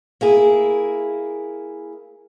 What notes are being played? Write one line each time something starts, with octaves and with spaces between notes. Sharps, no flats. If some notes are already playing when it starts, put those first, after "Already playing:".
A#3 E4 G#4